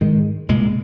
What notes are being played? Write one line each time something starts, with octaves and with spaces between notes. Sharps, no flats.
G#2 D#3 G#3
C2 A#2 G#3